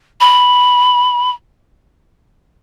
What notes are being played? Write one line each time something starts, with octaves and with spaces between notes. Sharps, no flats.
B5